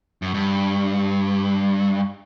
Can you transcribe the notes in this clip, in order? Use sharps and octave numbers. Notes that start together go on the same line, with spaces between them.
F#2
G2